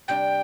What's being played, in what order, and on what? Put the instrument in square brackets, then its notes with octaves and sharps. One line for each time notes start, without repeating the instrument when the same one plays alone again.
[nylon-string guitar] C3 G3 D4 [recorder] G5